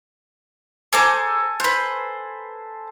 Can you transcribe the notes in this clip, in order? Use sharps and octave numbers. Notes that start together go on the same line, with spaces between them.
G#4 A4 C5 G#5 A#5 D6
B4 C5 F#6